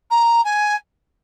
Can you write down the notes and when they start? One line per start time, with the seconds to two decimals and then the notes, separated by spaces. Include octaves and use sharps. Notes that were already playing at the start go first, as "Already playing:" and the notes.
0.11 A#5
0.45 G#5